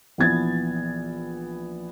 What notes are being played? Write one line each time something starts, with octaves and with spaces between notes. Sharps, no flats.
A#1 E3 B3 G#6 A6